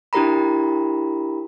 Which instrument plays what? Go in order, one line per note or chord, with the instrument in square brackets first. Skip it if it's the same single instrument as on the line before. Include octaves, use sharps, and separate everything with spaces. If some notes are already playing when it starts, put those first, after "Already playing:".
[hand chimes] D4 E4 G4 A#4 A#5 B5